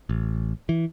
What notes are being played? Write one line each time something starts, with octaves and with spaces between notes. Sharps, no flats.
A1
E3